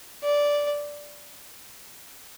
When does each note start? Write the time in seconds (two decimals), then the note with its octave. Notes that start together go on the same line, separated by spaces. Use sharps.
0.23 D5